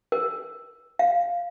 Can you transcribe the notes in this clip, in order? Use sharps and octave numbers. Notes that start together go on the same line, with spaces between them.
A#4
F5